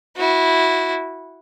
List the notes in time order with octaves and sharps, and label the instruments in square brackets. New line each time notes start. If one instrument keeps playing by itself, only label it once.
[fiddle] E4 F#4